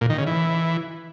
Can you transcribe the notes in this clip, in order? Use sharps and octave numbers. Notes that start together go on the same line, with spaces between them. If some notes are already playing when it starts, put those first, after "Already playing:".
A#2
D#3
C#3
E3